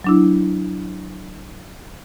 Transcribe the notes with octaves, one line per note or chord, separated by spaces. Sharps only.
F#3 D4 E4